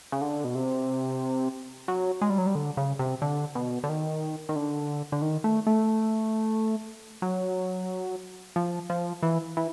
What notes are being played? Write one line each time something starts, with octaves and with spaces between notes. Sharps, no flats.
C#3
D3
B2
C3
F#3
G#3
G3
F#3
G3
D3
C#3
C3
D3
B2
D3
D#3
D#3
D3
D3
D#3
A3
A3
F#3
F3
F3
E3
E3